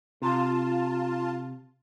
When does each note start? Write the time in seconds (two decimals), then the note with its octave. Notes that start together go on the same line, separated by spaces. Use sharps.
0.22 C3 F4 A5